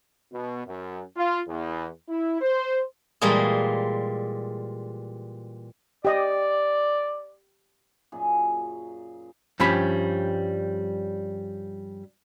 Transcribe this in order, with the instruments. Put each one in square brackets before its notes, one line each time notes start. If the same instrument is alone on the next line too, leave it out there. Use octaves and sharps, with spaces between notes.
[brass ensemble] B2
F#2
F4
E2
E4
C5
[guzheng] A#2 E3 G3 G#3 A#3 G#4
[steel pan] G4 D#5 G5 [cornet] D5
[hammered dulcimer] F#2 A#2 G#4
[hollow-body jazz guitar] G2 F3 G3 C#4 B5